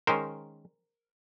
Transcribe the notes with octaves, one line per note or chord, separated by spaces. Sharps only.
D#3 G#3 C#4 A#4 C5